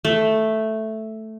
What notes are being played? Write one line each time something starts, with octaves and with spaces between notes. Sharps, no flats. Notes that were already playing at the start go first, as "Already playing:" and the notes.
A3